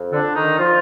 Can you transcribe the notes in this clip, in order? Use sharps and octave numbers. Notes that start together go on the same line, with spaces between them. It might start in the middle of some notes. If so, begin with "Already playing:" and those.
Already playing: F2
D3 D4
D3
D#3 D#4
F3 F4